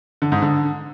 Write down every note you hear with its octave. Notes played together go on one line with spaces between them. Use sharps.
D3
G#2
D3